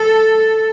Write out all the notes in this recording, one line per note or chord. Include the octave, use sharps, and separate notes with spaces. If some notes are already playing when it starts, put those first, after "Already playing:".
Already playing: A4